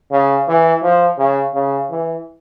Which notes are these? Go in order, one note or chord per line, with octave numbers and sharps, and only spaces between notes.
C#3
E3
F3
C#3
C#3
E3